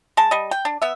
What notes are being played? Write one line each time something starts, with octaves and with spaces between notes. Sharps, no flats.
G#3 A5
G3 D#5
G5
D4
B3 E5